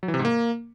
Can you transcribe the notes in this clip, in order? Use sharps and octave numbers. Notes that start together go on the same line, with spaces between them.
F#3
E3
C3
G#2
A#3